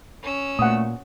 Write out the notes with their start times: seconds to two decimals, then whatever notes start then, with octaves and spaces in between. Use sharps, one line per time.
0.22 C#4 E6
0.59 A#2 A3 F#5 D#6